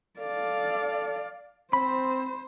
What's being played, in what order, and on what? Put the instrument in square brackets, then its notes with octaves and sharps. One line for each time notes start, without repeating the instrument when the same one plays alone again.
[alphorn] A4 [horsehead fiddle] D5 F5
[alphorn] C4 [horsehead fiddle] C5 [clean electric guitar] B5